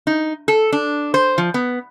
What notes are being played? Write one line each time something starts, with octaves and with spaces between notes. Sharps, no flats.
D#4
A4
D4
C5
F3
B3